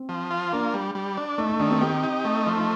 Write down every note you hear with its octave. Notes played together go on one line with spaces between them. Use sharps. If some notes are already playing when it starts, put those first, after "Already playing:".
Already playing: C4
F3
F4
A#3 D4
G3
G3
D4
A3 D#4
D#4
D#3 D4
C4
C4 G4
D#4
A3
F3
D#4